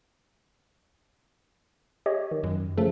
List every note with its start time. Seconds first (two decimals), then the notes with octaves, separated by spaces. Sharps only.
2.06 G4 C#5 D#5
2.31 D#3
2.43 F#2
2.77 C#3 F3 A3